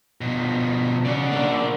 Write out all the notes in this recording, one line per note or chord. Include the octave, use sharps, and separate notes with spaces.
B2 F3
C#3 D5 F#5
A#3 D4 A#4